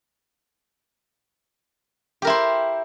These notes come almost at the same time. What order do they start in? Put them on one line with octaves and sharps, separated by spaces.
G4 A#4 E4 C5